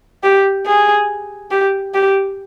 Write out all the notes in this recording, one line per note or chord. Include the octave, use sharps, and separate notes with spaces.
G4
G#4
G4
G4